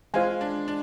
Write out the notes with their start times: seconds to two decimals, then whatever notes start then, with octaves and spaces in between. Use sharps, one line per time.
0.14 G#3 F4 C5 F5 G#5
0.41 D4
0.68 D4